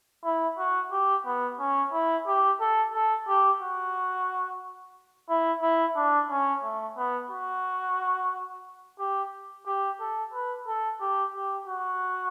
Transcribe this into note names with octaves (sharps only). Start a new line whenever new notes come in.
E4
F#4
G4
B3
C#4
E4
G4
A4
A4
G4
F#4
E4
E4
D4
C#4
A3
B3
F#4
G4
G4
A4
B4
A4
G4
G4
F#4